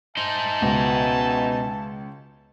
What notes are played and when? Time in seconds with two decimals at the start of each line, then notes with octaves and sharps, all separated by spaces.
0.17 D#4 C5 E5 G#5 A5
0.62 C#2 B2